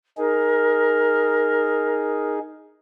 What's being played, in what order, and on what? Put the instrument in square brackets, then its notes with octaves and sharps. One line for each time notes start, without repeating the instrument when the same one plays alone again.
[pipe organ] D#4 G#4 [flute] A#4